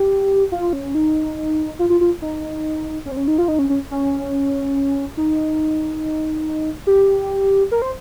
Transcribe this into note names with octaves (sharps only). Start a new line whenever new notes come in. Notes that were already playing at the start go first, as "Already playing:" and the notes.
Already playing: G4
F4
C#4
D#4
F4
F4
F4
D#4
C#4
C4
C#4
D#4
F4
D#4
C#4
C#4
C#4
D#4
G4
A#4
C5